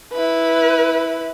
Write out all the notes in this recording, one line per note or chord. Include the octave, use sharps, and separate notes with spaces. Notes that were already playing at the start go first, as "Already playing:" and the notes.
E4 B4